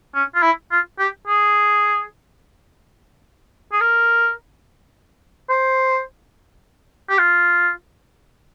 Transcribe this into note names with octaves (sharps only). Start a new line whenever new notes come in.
C#4
F4
E4
F4
G4
G#4
G#4
A#4
C5
G4
F4